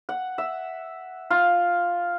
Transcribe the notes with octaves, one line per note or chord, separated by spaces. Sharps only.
F#5
E5
F4